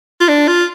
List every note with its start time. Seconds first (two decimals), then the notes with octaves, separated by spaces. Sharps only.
0.21 F4
0.29 D4
0.48 F4